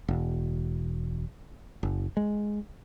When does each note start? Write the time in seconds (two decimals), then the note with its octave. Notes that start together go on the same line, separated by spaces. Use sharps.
0.08 E1
1.83 F#1
2.17 G#3